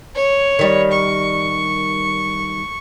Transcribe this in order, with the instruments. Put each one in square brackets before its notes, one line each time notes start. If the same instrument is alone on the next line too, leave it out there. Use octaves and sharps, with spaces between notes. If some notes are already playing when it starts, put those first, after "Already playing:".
[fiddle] C#5
[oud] D#3 G3
[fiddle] C#6